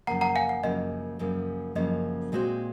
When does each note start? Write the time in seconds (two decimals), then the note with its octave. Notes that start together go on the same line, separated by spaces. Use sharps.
0.07 F#2 C#3 F3 A#3 F#5 A#5
0.21 F#5 A#5
0.35 F5 G#5
0.49 F#5
0.63 F#2 C#3 F3 A#3 D#5
1.19 F#2 C#3 F3 A#3
1.75 F#2 C#3 F3 A#3 D#5
2.32 A#2 G#3 C4 F#4 C5